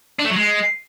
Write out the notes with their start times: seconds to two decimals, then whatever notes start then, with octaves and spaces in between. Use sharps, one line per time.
0.19 D4
0.25 A3
0.30 F#3
0.36 G#3